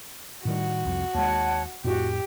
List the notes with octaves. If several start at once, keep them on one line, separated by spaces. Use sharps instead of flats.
A2 D#3 G3 F#4
C2 F2
D#2 G#3 C#5 F#5 A5
F2 A2 F#4 G4